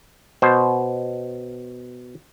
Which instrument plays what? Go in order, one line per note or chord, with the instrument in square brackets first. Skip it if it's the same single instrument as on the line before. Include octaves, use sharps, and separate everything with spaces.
[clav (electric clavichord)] B2 C5